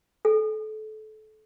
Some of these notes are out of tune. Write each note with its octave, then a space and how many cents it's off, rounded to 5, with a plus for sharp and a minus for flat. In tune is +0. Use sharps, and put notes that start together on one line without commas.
A4 -25